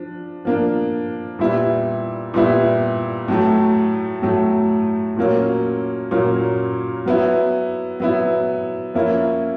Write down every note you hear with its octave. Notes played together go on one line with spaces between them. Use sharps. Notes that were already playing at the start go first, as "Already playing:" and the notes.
Already playing: F3 D4
F3 A#3 D4
A#2 G3 B3 E4
A#2 G3 B3 E4
A2 F#3 A3
A2 F#3 A3
A#2 F#3 A#3 C#4
A#2 F#3 A#3 C#4
F#3 B3 E4
F#3 B3 E4
F3 A#3 C#4 E4